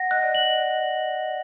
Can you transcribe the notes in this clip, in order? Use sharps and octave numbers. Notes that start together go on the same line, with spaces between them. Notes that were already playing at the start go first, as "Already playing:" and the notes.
Already playing: F#5 A#6
D#5 F#6
D5
F#7